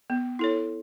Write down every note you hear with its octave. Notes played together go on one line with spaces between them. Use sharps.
B3
E4 A4 C#5